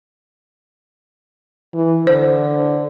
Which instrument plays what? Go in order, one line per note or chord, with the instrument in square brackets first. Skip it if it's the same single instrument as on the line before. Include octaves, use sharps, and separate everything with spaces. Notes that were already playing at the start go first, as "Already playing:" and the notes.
[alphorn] E3
[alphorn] D3 [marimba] C5